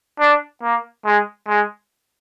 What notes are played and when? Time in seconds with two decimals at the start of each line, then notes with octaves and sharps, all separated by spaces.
0.20 D4
0.62 A#3
1.05 G#3
1.48 G#3